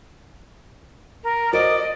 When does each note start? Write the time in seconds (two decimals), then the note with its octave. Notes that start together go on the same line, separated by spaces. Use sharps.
1.24 A#4
1.53 F#4 A#4 C5 D5 D#5